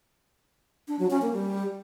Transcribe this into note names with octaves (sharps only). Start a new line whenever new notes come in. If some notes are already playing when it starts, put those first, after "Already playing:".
D4
F#3
C#4
A#3
G3